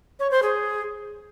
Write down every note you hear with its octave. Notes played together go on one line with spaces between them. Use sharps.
C#5
C5
G#4